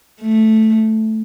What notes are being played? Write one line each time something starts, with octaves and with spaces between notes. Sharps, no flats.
A3